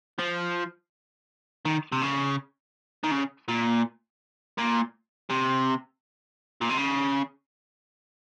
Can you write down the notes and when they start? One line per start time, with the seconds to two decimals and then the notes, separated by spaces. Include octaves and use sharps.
0.19 F3
1.65 D#3
1.92 C3
2.02 C#3
3.03 D#3
3.11 C#3
3.48 A#2
4.58 A#2
5.30 C3
6.61 A#2
6.69 C3
6.77 C#3